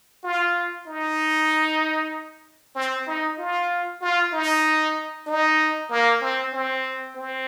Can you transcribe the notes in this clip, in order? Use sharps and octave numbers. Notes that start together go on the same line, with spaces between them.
F4
D#4
C4
D#4
F4
F4
D#4
D#4
A#3
C4
C4
C4